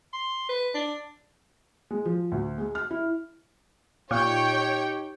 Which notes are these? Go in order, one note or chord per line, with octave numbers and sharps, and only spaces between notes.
C6
B4
D4
G#3
F3
D2
G#3
F6
E4
A#2 D#4 G4 C#5 G5